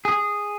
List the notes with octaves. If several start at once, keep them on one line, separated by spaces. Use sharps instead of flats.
G#4